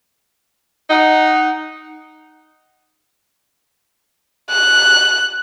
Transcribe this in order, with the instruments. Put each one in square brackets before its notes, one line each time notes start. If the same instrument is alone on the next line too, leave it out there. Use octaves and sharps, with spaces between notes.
[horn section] D#4 F#5
[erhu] F#6